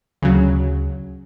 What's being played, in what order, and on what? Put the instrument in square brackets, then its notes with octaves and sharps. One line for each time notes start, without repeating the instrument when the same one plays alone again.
[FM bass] D2 [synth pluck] C#3 F#3